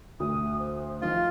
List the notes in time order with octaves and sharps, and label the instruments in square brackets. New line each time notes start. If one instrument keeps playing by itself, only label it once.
[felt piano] D2 [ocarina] D#6
[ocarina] C5
[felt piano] D#3 F3 [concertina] F4